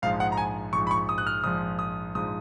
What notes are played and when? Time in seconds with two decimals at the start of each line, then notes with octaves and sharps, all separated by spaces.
0.02 A#1 G#2 F3 F5
0.20 F#5
0.32 A#5
0.37 G#5
0.73 A#1 G#2 F3 C#6
0.87 B5
0.91 C#6
1.09 D#6
1.18 F#6
1.27 F6
1.43 A#1 G#2 F3 D#6
1.79 D#6
2.15 A#1 G#2 F3 D#6